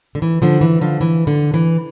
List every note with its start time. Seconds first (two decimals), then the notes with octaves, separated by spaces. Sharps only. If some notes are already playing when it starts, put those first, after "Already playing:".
0.15 D3
0.22 E3
0.42 D3 F3
0.61 E3
0.81 D3 F3
1.01 E3
1.27 D3
1.54 E3